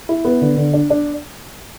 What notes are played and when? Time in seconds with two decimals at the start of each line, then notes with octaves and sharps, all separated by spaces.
0.09 E4
0.25 B3
0.41 D3
0.57 D3
0.74 D4
0.90 D4